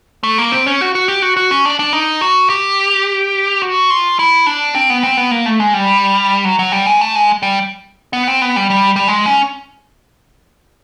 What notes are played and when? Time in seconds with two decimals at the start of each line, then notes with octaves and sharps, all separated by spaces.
0.23 A3
0.38 A#3
0.52 C4
0.66 C#4
0.81 F#4
0.95 F#4
1.08 G4
1.22 F#4
1.37 F#4
1.51 C#4
1.65 D4
1.79 D4
1.93 D#4
2.21 F#4
2.50 G4
3.62 F#4
3.90 F4
4.19 E4
4.46 D4
4.75 C4
4.90 B3
5.03 C4
5.17 B3
5.31 A#3
5.46 A3
5.60 G#3
5.74 G3
6.45 F#3
6.59 F#3
6.72 G3
6.86 G#3
7.01 A3
7.15 G#3
7.43 G3
8.13 B3
8.28 C4
8.41 B3
8.56 G3
8.70 G3
8.96 G3
9.08 G#3
9.26 C#4